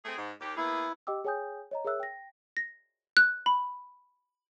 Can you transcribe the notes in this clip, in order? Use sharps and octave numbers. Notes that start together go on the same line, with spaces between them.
A3 C4 G#4
G#2
D#2 G4
A#3 B3 E4 G#4
G4 D#5 G5 D6 E6
G#4 C#5 G5 G#5 D#6 G6
C#5 D#5 A#5
G#4 A#4 C#5 E5 E6 F#6
G5 A#6
A#6
F#6
B5